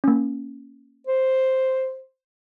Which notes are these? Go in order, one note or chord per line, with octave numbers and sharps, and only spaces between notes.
A#3 C#4
C5